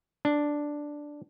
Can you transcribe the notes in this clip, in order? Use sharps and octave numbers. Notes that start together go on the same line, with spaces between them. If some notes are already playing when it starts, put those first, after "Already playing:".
D4